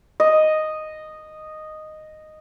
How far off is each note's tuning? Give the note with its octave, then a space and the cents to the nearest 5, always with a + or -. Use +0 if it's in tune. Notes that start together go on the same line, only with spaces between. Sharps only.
D#5 -5